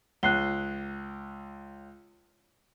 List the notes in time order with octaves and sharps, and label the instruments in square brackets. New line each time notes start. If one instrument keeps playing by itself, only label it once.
[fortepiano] C#2 [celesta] F#6 C7 G7